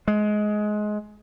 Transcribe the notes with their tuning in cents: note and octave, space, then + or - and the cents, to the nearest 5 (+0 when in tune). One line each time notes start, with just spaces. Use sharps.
G#3 +20